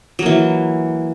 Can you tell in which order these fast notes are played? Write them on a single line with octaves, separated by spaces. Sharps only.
F#3 A#3 E3